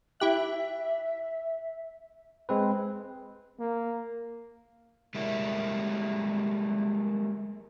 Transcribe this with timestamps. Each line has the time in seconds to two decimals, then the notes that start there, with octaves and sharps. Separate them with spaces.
0.20 E4 G4 E5 F#6
2.49 G#3 C4 B4
3.59 A#3
5.15 G3 G#3 A#3 E4